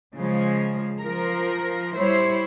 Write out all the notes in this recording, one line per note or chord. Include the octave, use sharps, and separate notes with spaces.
C#3 F3 G#3
F3 A#4
G3 E4 C5 C#5